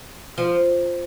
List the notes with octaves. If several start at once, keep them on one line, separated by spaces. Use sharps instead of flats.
F3